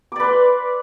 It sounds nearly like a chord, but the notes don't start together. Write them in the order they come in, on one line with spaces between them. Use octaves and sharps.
D6 D5 B4 C6